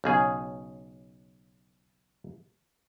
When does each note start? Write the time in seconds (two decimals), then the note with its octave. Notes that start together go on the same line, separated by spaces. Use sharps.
0.04 B1 C#3 G#4